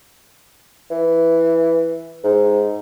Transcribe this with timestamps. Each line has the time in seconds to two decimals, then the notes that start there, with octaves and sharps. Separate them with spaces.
0.90 E3
2.24 G#2